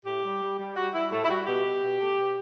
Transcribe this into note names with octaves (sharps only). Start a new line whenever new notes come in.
A2 G4
G3
G3
G3
G3 F#4
G3 E4
A2 A3
E4
G3 F#4
B2 G4
B2
B2
A3
B2